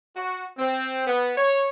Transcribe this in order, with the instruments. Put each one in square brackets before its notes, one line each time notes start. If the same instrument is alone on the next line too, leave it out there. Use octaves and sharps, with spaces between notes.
[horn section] F#4
C4
B3
C#5